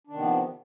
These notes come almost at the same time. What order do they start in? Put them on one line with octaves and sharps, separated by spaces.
D4 D#3 C3 B3 F3